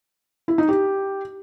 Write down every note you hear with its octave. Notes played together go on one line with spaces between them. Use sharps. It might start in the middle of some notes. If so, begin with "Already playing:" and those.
E4
D#4
G4